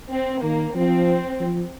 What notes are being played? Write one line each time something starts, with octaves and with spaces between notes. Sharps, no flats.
C4
D#3 A#3
F3 C4
F3